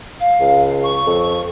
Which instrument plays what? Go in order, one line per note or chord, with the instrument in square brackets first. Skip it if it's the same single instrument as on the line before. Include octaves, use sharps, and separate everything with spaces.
[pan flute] F5
[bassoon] C#2
[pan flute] C#6
[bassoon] F2